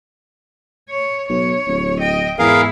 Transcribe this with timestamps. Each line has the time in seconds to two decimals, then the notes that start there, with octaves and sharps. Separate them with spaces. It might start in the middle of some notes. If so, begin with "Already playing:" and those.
0.90 C#5
1.29 B1 C#5
1.67 D1
2.00 D#5 G5
2.39 E2 G#2 E4 G#4 A#4 F5